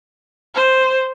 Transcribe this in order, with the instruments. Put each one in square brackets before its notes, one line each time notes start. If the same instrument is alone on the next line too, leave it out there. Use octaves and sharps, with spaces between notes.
[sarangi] C5